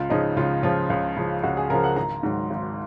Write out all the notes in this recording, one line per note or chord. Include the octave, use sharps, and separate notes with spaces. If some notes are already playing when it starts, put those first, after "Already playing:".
Already playing: C#2 F4
C#3 F3 D#4
C#2 F4
C#3 F3 F4
C#2
C#3 F3
C#2 F#4
G#4
C#3 F3 A#4
F#5
G#1 A#5
G#2 D#3 F#3
G#1